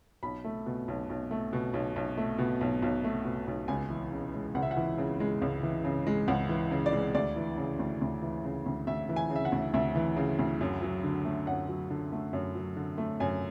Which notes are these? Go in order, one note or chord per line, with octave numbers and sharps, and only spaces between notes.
B1 B5
A3
B2
B1
B1
A3
B2
B1
B1
A3
B2
B1
B1
A3
B2
B1
C#2 G#5
E3
C#3
G#3
C#2 F#5
E5
F#5
E3
C#3
G#3
C#2
E3
C#3
G#3
C#2 F#5
E3
C#3
D5
G#3
D2 D5
E3
C#3
D2
D2
E3
C#3
D2
D2 E5
E3
G#5
C#3
E5
F#5
D2
D2 E5
E3
C#3
D2
F#2
F#3
D3
A3
F#2 F#5
F#3
D3
A3
F#2
F#3
D3
A3
F#2 G#5